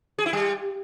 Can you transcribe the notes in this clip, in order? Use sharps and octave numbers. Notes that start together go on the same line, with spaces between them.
G#4
E4
G3